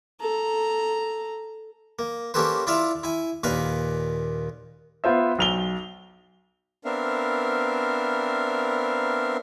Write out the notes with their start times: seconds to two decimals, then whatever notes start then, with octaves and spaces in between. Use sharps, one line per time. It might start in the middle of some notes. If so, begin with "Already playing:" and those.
0.20 A4 A#5
1.99 A#3
2.34 A#3 C#4 G4 A4 B4 C5
2.67 E4 F4 D5 E5 F5
3.03 E4 G#5
3.43 D#2 A#2 B4 F5 G#5 B5
5.04 B3 F4 C5 E5
5.39 B1 F7 G7
6.85 B3 C4 D4 A#4 E5 F5